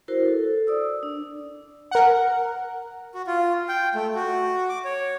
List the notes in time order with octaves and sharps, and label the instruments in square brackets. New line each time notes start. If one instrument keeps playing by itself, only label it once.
[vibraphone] E4 F#4 A#4 C5
A4
D5 D#6 E6
D4
[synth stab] A#4 F#5
[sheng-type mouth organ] F#4
F4
G5
A3
F#4
D6
C#5